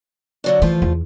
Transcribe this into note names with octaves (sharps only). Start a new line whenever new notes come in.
D3 F#3 D4
E3 F3 A3 F4
E2